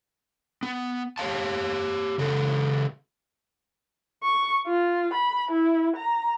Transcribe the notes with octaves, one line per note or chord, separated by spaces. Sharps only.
B3
G4 C#5 D5 F5 A5
C#3 F#3 A4
C#6
F4
B5
E4
A#5